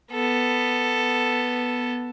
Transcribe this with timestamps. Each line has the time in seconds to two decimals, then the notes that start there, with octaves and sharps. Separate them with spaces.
0.12 B3 A4